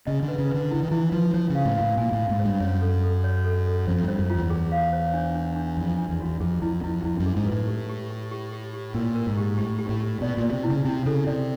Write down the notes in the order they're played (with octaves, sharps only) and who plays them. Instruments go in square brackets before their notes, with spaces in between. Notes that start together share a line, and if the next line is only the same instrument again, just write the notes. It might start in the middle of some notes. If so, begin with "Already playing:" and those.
[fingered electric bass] C#3 [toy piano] D#5
[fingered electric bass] D3
[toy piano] B4
[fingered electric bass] C#3
[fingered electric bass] D3 [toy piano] B4
[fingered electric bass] D3 [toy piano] E4
[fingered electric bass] D#3
[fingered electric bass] E3 [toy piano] E4
[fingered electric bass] F3 [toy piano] B4
[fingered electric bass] F3 [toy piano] C5
[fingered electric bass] C#3
[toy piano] F5
[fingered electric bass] A2
[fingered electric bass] A2 [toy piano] F5
[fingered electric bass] A#2 [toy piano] G#5
[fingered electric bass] A2
[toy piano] F5
[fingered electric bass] G#2
[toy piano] C5
[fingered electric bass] G2
[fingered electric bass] F#2 [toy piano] C#5
[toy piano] A4
A4
C#5
A4
A4
[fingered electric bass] F2 [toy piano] C5
[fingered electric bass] G2 [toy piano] C5
[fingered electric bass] F#2
[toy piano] F4
[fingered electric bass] E2
[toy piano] G#4
F5
C5
D4
D4
D4
[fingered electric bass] F2 [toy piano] D4
[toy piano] D4
[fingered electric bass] E2
[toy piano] F#4
[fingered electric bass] E2
[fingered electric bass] F2 [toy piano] G#4
[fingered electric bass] F2 [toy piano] E4
[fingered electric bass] F2 [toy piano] E4
[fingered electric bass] F2 [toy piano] E4
[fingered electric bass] F#2
[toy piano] G#4
[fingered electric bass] G#2
[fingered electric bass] A2 [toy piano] B4
[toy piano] G4
G4
G4
G4
G4
G4
[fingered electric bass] A#2 [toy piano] A#4
[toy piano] A#4
[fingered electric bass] G#2
[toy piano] G4
[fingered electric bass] A2 [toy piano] G4
[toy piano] G4
[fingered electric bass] A2
[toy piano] G4
[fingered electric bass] B2 [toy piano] D5
[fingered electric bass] A#2
[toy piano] D5
[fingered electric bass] C3
[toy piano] E4
[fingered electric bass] C#3
[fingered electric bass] C3 [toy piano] E4
[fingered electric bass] C#3 [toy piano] A4
[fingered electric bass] C3 [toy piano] D5